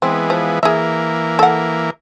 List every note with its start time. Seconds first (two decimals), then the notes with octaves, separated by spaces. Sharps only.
0.02 E3 G#3 B3 C4
0.30 F3
0.63 E3 A#3 G#4 E5
1.39 A4 F#5